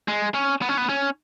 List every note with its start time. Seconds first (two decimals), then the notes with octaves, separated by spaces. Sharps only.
0.08 G#3
0.34 C#4
0.62 B3
0.69 C#4
0.77 B3
0.89 C#4